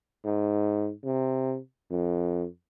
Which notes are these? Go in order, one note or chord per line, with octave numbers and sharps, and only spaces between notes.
G#2
C3
F2